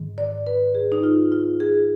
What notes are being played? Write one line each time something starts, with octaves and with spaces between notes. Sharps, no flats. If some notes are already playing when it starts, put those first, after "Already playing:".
Already playing: G#2 D#3
D5
B4
G#4
D#4
F4
F4
G#4